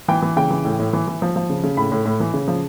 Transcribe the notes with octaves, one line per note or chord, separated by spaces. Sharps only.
E3 G5
E3
C#3 G5
E3
A2
A2
E3
E3
F3
F3
C#3
C#3
A2 B5
A2
A2
E3
C#3
F3